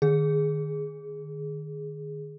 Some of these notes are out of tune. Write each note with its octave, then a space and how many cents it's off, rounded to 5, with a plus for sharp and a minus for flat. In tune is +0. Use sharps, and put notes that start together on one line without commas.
D#3 -35 G#4 +0